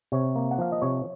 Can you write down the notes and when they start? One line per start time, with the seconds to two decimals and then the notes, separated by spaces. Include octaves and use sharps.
0.12 C3 C#5
0.36 A#3
0.51 F#5
0.58 F3 F5
0.72 D#5
0.82 C3 C#5